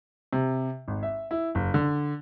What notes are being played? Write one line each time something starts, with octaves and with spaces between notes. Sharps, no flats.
C3
G#1
E5
E4
F#1
D3